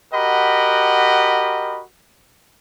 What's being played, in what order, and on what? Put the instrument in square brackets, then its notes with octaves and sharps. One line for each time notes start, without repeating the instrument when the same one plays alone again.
[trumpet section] F#4 G4 A#4 D#5 F#5 B5